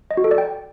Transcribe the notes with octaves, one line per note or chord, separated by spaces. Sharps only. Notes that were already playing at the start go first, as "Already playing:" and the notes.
D#5
F#4
A4
D5
G5